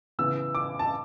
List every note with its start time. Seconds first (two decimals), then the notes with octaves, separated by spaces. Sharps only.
0.19 C#3 E3 B3 E6
0.55 D6
0.79 A5